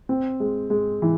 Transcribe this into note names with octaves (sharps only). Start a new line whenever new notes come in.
C4
G#3
G#3
E3